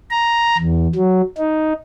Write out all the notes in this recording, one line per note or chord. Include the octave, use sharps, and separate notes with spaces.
A#5
E2
F#3
D#4